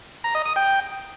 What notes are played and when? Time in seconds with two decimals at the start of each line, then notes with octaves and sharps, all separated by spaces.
0.24 A#5
0.35 D#5
0.45 D#6
0.56 G5